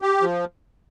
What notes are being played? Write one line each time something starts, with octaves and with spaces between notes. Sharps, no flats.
G4
F3